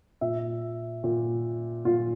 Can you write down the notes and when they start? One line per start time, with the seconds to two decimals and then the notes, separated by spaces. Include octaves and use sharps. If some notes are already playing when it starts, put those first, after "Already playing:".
0.21 A#2 E5
1.04 A#2
1.85 A#2 F4